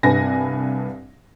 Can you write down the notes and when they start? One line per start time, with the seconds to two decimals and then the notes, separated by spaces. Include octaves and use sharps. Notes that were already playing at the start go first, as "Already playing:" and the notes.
0.03 C2 G2 D4 B4 G#5 A#6